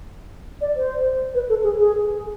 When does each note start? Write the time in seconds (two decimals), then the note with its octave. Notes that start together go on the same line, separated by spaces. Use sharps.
0.61 D5
0.76 C5
1.35 B4
1.49 A4
1.63 G#4
1.79 G#4